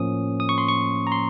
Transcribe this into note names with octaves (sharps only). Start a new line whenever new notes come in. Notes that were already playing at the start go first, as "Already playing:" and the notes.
Already playing: A2 F3 A#3 C#4 D#6
D#6
C#6
C6
C#6
A#5
C6